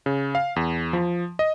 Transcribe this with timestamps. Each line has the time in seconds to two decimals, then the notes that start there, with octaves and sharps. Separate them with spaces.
0.06 C#3
0.35 F5
0.56 E2
0.93 F3
1.39 D#5